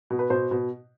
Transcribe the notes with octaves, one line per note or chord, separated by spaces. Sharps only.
B2
B4
B2 C5
B2